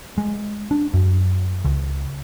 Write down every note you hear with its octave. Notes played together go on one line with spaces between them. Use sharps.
G#3
D4
F#2
C#2